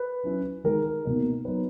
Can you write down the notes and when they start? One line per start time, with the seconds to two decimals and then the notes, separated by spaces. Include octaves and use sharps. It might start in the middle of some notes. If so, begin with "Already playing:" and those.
Already playing: B4
0.23 F#3 C#4 E4
0.64 D#3 G#3 D#4 A#4
1.05 B2 A#3 D#4
1.45 F#3 B3 D#4 B4